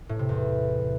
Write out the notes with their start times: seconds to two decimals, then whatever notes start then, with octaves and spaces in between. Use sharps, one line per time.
0.09 A2
0.19 C3
0.29 E2